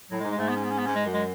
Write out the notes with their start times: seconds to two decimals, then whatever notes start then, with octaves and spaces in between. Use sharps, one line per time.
0.11 A2 F#3
0.20 G#3
0.24 G#2
0.31 G#3
0.37 G#2 A3
0.49 B3
0.56 C#4
0.64 B3
0.71 C#4
0.78 B3
0.86 G#2 C#4
0.95 G#3
1.05 F#2
1.14 G#3